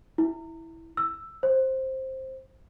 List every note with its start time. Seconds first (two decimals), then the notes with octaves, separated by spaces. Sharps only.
0.18 E4
0.97 E6
1.43 C5